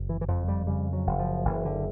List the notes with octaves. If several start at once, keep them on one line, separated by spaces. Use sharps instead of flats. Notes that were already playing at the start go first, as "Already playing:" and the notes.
Already playing: F#1
E3
E3
F2 F3
G3
C#3 G3
F#3
F#1
F3
F#1 E3
D3